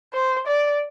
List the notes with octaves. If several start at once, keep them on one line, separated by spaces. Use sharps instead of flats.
C5
D5